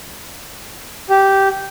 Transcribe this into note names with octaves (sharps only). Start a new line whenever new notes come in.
G4